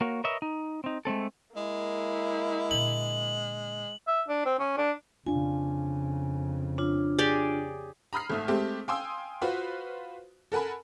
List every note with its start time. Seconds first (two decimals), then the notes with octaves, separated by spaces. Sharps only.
0.01 A#3 F#4 A#4 C#5
0.24 A#4 B4 C#5 D#5 E5
0.42 D#4
0.84 C4 D#4
1.05 G#3 A3 C4 A4
1.56 G#3 A#3 E4
2.71 A#2 D3 F#7
4.07 E5
4.28 D4
4.45 C4
4.59 C#4
4.77 D4
5.27 F2 C#3 D4 F4 G#5
6.78 D4 F4 C#5
7.18 G4 G#4 D5
8.13 A#5 B5 D#6 F6 C7
8.30 G#1 A3 F6
8.48 G#3 A3 C4 G4
8.88 F5 G5 G#5 C6 D#6 E6
9.42 F4 F#4 B4 C5 F5
10.52 A4 A#4 F#5 G#5 B5